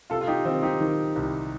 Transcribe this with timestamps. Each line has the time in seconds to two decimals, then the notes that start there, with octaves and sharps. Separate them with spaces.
0.10 C3 F4 A4
0.21 F4
0.27 D#4 G4
0.45 D#3 C4 D#4
0.63 D#4 G4
0.80 D#3
1.16 C2